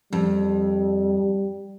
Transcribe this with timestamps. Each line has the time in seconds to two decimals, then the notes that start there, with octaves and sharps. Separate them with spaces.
0.13 F2 G3